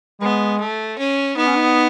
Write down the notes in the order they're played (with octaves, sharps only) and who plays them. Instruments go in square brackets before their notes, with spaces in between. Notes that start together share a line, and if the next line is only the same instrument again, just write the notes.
[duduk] G#3 [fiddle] B3
[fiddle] A3
C#4
[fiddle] B3 [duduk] D#4
[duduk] C#4
D#4